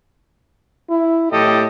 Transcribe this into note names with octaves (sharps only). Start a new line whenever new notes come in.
E4
A2 G4 A4 D#5